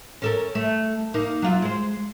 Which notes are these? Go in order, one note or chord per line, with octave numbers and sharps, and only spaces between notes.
C#4 A4 A#4
A3
A#3 D#4
F#3 F4
G#3 C5